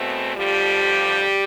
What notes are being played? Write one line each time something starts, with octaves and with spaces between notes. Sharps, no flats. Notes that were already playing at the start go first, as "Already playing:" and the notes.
Already playing: E2 B2 A3 C4
F2 D3 F3 G3 G4